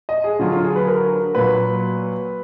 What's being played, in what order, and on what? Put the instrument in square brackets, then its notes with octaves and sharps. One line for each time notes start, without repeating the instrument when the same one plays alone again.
[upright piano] D#5
G#4
D3 F#3 F4
F4
G#4
B4
A#4
A#2 F#3 B4